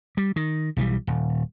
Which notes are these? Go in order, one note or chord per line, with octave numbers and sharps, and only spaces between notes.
G3
D#3
B1 E3 F3 G3
D#1